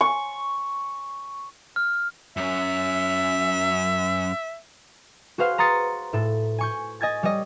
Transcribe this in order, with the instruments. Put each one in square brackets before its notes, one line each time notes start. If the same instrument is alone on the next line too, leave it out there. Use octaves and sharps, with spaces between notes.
[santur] C#6
[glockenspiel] F6
[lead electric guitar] F#2 C#4 [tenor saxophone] E5
[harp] F#4 G#4 B4 C5 F5
A#5 C6 D#6 A6 C#7
A2 A4
G#5 C#6 G6
D#5 G#5 G#6 A6
G3 C#5 D#5